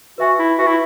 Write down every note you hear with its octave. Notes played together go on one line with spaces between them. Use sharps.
F#4 B4 E5 G#5
E4
F#4 B4 E5 G#5
E4